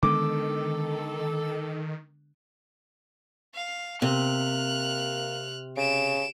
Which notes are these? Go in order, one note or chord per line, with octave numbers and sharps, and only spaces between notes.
D3 D#3 G#3 B3 A4 D6
F5
C3 A#3 F6 F#6
C#3 D7 E7